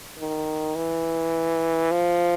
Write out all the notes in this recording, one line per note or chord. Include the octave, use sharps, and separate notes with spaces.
D#3
E3
F3